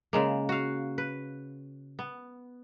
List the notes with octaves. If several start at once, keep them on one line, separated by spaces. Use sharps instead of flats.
C#3 G#3 A#3
F#4 F5
B4
B3